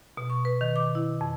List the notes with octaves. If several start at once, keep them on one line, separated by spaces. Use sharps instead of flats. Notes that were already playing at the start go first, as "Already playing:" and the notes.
B2
C#6
B4
D#3
D6
E4
F2